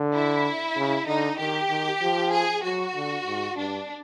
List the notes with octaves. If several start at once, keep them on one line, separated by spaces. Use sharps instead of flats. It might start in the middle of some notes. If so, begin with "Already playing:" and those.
Already playing: D3
E4
C#3
D3 D#4
D#3 G4
D#3
F3
G#4
F#3 F#4
D3
G#2
G2 D4